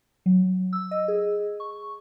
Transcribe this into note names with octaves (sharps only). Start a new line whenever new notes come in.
F#3
E6
D#5
G#4
C#6